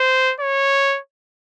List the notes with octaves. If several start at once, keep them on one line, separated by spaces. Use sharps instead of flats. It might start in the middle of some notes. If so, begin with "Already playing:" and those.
Already playing: C5
C#5